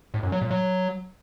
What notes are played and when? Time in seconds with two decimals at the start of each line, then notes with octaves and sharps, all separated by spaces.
0.14 A2
0.23 F#2
0.32 F#3
0.41 A#2
0.51 F#3